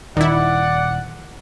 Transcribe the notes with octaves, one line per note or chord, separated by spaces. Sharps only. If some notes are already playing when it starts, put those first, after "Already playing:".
D#1 D#3 E4 D5 F#5